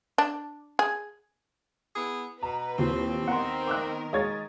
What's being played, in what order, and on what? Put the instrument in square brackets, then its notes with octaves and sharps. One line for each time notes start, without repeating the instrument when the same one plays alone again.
[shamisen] D4
G#4
[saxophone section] B3 E4 G#4
[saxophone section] B2 [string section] B4 [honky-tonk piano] A#5
[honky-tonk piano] D#2 A#2 E3 [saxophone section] C4
[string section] D#3 A#4 [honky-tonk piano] B3 [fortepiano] F#5 C6
[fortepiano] D6 E6 F#6
[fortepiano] G#3 C#5 F5 [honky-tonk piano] D#5 G#6 A6